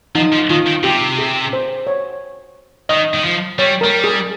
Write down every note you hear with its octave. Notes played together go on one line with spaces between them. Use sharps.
F3 D#4
F3
D#3 F4
D#3
C3 G4
G#4
C5
C#5
D#3 D#5
D#3
F3
G3 C#5
G3 A#4
G#4